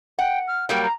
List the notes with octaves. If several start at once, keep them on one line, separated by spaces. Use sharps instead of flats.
F#5 G5
F6
F#3 G3 A#3 G5
A#5